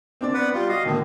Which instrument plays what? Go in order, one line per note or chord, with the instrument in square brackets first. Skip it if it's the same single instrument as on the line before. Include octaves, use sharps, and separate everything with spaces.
[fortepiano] C4 D4 D5
[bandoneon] B3 B4 F#5
[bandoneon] G3 F4 [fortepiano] D5
[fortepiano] F#4 [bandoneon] D#5 F5
[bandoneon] A2 D3 [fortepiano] D#3 A#3